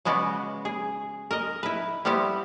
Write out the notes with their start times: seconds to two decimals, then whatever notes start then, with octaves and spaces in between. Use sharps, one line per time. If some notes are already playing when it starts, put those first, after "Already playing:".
0.05 C#3 G#3 B3 F#4 D5
0.65 G#4
1.31 A#4 D#5
1.63 E4 B4
2.05 G3 B3 C4 E4 G4